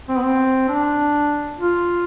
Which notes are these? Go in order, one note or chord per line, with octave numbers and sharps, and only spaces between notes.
C4
B3
C4
D4
F4